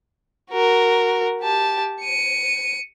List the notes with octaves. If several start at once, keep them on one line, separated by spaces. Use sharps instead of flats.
F#4 A#4
G4 A5
C#7 D#7